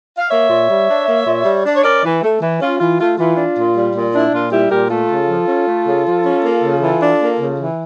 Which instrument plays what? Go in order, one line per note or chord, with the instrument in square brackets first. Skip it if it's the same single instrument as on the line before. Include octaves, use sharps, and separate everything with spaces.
[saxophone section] F5
A#3 C#5 E5
A#2
G3
D4
A#3
A#2
G3
D4
C#5
C#4 A#4 D5
E3
A3
E3
C#4 F4
E3 F4
A3 F4
E3 F4
D4
A#2
G3
A#2
D4 E4
A#2 F4
G3 E4 G4
A#2 G4 A#4
A3 F4 A4
C#3
F3
C#4
A3
C#3
F3
C#4
A#3
C#3
E3
D4
A#3
C#3
E3